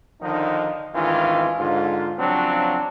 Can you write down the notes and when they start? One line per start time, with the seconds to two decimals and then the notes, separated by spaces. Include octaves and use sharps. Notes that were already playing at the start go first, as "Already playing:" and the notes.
0.22 D3 D#3 F3 D#4
0.95 D2 G#2 D#3 E3 C#4 F4
1.60 G#2 D3 F4
2.19 C#3 F3 F#3 C4 D4